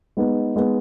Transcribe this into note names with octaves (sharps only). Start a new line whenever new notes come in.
G#3 B3 D#4
G#3 B3 D#4